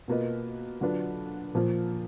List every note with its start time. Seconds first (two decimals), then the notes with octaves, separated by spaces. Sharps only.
0.08 B2 A#3 F4 B4 D#5
0.81 D3 F#3 D4 F4 B4
1.55 A#2 F3 A#3 F4